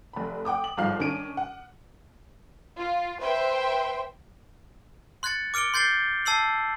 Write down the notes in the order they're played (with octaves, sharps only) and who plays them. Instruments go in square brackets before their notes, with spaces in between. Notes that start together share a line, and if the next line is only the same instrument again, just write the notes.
[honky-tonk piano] F1 B5
F#5 G5 D6 D#6
F#7
G1 G#2 F3 F5 F6 C7
D#3 C#4 D4 D7 D#7
F#5
[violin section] F4
B4 C5 E5 G5 C6
[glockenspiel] C6 F#6 G#6 A6 C#7
D6 F6 C#7 D7 G7
C6 G6 A6 C7 G7
A5 E6 C7 F#7